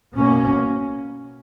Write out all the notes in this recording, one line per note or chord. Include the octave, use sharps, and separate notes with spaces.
B2 A#3 C#4